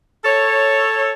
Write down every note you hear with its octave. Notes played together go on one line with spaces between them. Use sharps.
A4 C#5